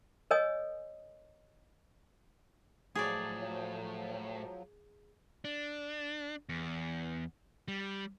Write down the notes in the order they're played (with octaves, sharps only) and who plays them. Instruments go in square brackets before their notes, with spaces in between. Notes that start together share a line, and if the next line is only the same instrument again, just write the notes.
[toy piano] A#4 C#5 D#5 G#5 D#6
[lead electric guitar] A2 [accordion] F3 F#3 [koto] G#4 D5
[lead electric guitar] D4
E2
G3